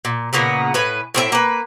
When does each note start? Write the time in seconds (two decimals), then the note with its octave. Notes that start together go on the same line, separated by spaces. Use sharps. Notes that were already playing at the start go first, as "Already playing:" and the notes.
0.05 A#2
0.33 A#2 C#3 A#3 B3
0.74 A2 B4 G#5
1.14 A2 C4 G#4 E5
1.32 A#3 B4